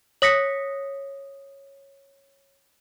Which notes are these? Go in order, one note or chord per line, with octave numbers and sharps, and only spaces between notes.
C#5 D#6 A#6 B6 C#7